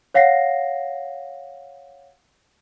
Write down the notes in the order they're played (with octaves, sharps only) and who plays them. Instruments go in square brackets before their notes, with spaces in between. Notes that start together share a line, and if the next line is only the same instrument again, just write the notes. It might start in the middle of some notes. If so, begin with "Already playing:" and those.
[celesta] C#5 F5 F#5 A#6 C7